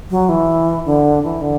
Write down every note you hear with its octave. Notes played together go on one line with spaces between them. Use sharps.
F#3
E3
D3
E3
D3